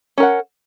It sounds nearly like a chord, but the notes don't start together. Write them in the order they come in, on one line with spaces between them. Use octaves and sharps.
C#4 A#4 F#5